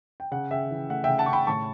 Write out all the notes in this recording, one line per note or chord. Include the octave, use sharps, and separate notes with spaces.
G5
C#3 F#5
C#3 E5 G5
E3
A3 F#5
C#3 E5 G5
F#5 A5
C#3 C#6
G5 B5
A2 A5 C#6